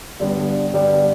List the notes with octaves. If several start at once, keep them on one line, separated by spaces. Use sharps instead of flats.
G2 D3 G3 B3
G2 D3 G3 B3